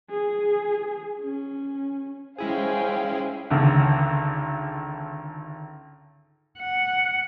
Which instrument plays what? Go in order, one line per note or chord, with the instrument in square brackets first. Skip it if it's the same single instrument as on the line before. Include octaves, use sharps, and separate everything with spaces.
[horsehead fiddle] G#4
C#4
[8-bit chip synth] G#3 E4 G#4 [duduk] C#4 [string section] C5 F5 G5 [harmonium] G#5
[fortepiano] G#1 C#2 D3
[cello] F#5